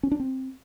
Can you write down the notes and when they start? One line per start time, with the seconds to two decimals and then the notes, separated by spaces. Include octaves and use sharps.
0.03 C#4
0.11 D4
0.20 C4